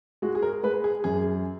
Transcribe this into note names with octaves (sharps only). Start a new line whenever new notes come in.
G#3 F#4
G#4
A#4
G#3 B4
G#4
F#2 G#4